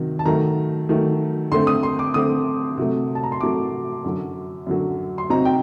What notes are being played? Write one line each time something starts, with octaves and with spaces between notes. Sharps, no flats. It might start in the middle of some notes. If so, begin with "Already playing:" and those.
Already playing: C3 D#3 F#3
A5
D#3 F#3 A3 A#5
D#3 F#3 A3
D3 A3 C4 C6
D#6
C6
D6
D3 A3 C4 D#6
C3 F#3 A3
A5
A#5
C6
C3 F#3 A3 D6
F#2 D3 F#3
F#2 D3 F#3
C6
C3 F#3 C4 D#4 A#5
G5